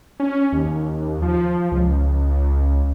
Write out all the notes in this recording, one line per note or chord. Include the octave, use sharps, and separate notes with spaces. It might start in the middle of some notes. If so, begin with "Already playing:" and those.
C#4
D#2
F3
C#2